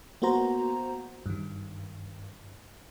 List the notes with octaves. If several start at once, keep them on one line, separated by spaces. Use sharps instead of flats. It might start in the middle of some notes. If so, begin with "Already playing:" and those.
A#3 B3 F#4 C5 A#5
G2 D#3